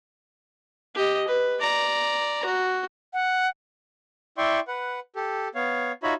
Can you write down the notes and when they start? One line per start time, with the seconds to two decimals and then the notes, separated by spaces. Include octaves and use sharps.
0.95 G4 D#5
1.28 B4
1.61 D5 A#5
2.45 F#4
3.13 F#5
4.38 E4 D5 E5 G5 C6 C#6
4.68 B4 F#5
5.16 G4 A4
5.55 B3 C#5 F5
6.03 D#4 F4 F#4 C#5 E5 B5